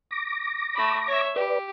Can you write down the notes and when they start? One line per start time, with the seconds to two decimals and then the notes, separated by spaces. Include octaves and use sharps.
0.11 D6 A#6
0.75 A3 B5
1.07 C#5 E5
1.36 G4 B4 D5